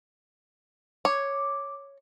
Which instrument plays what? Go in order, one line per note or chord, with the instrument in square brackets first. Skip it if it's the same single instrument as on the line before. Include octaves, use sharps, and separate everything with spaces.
[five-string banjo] C#5 [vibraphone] D6